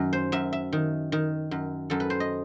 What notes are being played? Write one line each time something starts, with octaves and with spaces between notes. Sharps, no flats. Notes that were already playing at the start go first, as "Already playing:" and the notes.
Already playing: F#2 D#3
C5
F#2 E5
E5
D#3
D#3
F#2
F#2 A4
B4
C5
D#5